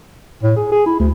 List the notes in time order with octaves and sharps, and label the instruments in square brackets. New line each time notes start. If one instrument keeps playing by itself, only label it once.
[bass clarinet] A2
G#4
G#4
E4
D2